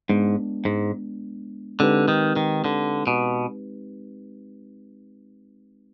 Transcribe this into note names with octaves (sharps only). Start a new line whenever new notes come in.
G#2 G#3 B3 D4
G#2
D3 G#3 C4 D#4 G4 B4
D#3
D#3
D3
B2